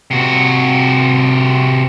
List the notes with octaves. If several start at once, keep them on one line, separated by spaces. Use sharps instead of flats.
C3 F#4